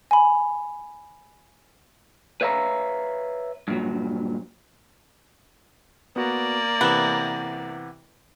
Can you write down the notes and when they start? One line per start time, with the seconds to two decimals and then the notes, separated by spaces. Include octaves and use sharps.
0.11 G#5 B5
2.41 B4 C#5 E5 F5 A#5
3.68 G2 A#2 F#3
6.16 A#3 B3 F#4 D5
6.81 C3 E3 B3 E7